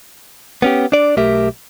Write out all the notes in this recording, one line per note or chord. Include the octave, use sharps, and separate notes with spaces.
B3 C#4 G4
D4 D5
B1 A3 G4 A#4 E5